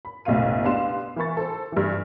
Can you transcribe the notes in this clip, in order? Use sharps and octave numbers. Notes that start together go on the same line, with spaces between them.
B5
F#1 B1 A2 E5 F5 D#7
B3 D4 G4 F5 C6 E7
E3 A#4 G#5 B5 C#6 A6
A4 C5
G2 E3